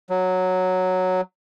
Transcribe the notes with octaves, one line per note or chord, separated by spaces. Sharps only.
F#3